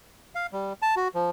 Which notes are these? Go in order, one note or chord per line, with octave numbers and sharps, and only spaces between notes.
F5
G3
A5
F#4
F3